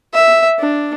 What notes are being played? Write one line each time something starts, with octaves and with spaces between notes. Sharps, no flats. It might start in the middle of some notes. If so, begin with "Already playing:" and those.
E5
D4